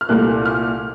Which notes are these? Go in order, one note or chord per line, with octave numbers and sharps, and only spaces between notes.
F6
C2 A#2 A3 F#6
F6